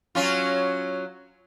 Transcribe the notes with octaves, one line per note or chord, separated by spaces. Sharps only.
F#3 C#4 F4